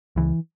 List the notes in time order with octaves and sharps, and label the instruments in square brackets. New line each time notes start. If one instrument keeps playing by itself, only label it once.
[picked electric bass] C#2 E3